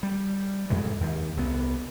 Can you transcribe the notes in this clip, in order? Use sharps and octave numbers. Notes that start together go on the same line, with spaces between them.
G3
F2 G#2 C3 E3
D#2
C2 B3